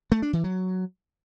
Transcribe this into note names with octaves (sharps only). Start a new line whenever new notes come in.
A3
D4
E3
F#3